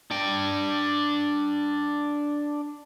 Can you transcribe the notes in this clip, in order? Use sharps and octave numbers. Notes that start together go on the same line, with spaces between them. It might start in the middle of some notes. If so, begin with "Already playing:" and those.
D4 G5